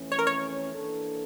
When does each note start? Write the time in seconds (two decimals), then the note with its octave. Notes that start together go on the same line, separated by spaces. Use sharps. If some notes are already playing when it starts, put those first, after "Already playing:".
Already playing: F2 E3 A3 C#4
0.12 C#5
0.19 A#4
0.27 C#5
0.73 E3 A#3 D4 A4